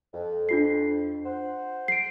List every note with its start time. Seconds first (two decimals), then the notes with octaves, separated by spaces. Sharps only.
0.14 F2
0.49 D4 F4 C7
1.25 C5 F#5
1.88 C7 D7